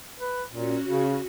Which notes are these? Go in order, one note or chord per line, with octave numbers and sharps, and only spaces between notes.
B4
A#2 C#4 F#4
C#3